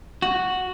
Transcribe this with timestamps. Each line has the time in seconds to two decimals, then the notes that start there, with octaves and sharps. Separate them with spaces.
0.22 F#4